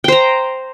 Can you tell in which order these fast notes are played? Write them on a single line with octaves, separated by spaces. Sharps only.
G5 C5 A#5